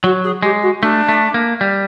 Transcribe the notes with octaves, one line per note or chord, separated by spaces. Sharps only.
F#3 F#4
G#4
G#3 G4
F#4
A3 D4
A3
A#3
G3